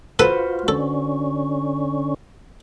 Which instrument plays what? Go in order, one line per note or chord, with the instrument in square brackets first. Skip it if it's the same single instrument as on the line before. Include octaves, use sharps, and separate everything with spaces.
[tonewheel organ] F4 [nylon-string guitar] F#4 C5 [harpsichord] A4 [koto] B4
[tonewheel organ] D3 C#4 [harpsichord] A4